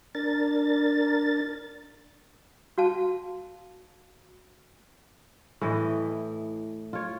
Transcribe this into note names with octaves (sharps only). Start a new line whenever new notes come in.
D4 A#4 A6
F#4 F5 A5
A2 E3 D#5
F4 C#5